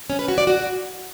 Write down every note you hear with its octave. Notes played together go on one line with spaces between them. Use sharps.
C#4
B4
F#4
D5
F#4